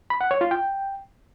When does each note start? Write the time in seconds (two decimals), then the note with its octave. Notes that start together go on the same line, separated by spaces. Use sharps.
0.10 B5
0.21 F#5
0.31 C#5
0.41 F4
0.51 G5